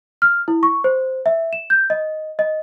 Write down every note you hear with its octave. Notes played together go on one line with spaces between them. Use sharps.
F6
E4
C#6
C5
E5
E7
G6
D#5
D#5